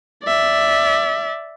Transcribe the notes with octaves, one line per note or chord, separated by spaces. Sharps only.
D5 E5